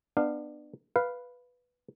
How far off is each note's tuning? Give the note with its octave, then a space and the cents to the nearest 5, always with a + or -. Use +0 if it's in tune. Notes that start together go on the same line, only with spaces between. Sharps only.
B3 +0 D4 +25 F5 +0
B4 +0 F5 +0